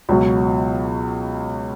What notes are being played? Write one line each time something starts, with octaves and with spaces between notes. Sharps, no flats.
C#2 B2 F#3